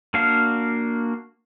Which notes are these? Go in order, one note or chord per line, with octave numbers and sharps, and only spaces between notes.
A#3 D4 F#4 F5